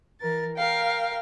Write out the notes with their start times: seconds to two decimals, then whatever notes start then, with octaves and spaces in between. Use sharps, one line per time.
0.21 E3 A#4 A6
0.56 A#4 F5 G5